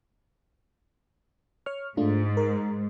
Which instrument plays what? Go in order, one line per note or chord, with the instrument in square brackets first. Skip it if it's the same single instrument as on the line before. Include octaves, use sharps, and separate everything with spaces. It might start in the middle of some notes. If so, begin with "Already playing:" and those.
[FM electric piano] C#5 C#6 F6
[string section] G#2 [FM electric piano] A3 D4 F4
[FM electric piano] A#4